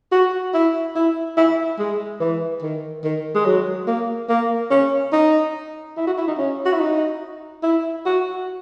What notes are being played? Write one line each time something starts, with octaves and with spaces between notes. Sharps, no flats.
F#4
E4
E4
E4
G#3
E3
D#3
D#3
G#3
F#3
A#3
A#3
C#4
D#4
E4
F#4
E4
D#4
C#4
F#4
E4
D#4
E4
F#4